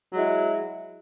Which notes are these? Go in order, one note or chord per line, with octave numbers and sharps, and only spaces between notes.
F#3 G#3 E4